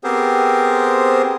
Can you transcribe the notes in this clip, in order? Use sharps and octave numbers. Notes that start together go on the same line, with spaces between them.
B3 C4 G4 G#4 A#4 C5